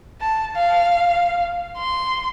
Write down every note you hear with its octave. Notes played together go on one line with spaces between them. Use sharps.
A5
F5
C6